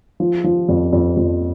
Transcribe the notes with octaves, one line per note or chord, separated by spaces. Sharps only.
F3
F3
F2
F2
F2